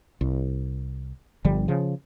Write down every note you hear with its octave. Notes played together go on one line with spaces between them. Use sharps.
C2
G1 D3 F3 G3
C#3 F3